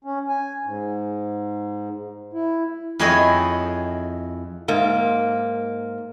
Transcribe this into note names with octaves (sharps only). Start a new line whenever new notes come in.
C#4
G#5
G#2
E4
F2 E4 G#4 C#5 D#5 G5
G#2 A#3